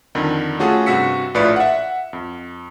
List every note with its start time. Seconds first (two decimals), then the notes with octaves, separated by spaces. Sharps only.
0.15 F2 D3 D#3
0.59 A3 C#4 F4 F#4 G#4 A4
0.86 G2 C3 F#4 E6 B6 C#7
1.34 A#1 A2 F4 B4 D5 C#7
1.56 E5 F#5
2.13 F2